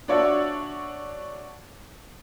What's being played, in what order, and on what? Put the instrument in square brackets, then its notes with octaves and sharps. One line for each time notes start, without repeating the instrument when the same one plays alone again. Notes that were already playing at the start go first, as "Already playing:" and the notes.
[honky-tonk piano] D4 F#4 C#5 D5 E5